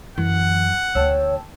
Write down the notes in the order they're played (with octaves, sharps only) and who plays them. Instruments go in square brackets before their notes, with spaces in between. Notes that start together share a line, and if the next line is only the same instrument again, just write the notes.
[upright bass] F#2 [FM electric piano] E3 [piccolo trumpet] F#5
[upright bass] D2 [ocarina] C#5 [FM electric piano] G5 A5 E6